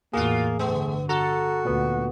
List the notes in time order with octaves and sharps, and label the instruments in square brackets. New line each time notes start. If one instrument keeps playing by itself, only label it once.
[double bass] E2 A2 [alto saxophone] A#3 [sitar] F4 F#4 [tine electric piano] G#4
[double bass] G1 D3 [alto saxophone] A3 [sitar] B3
[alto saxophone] F#4 [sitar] A4 [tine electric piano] A#5
[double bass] D2 [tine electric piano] A#2 B3